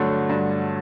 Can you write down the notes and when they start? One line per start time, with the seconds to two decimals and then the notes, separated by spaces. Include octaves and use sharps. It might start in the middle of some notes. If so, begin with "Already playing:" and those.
Already playing: G2 D3 F#3 A3
0.29 G2